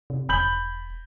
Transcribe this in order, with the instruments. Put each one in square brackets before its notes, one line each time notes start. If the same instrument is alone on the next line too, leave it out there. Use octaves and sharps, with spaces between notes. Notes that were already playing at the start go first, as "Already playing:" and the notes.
[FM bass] C3
[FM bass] E1 [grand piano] B5 G6 F#7